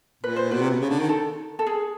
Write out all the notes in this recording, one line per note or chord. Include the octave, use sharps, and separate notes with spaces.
A#2 B4
C5
B2 B4
C3
B2
C#3
D3
D#3
A4
A4
G#4